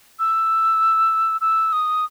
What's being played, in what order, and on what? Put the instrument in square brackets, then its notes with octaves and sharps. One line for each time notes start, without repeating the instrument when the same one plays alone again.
[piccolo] E6
E6
D#6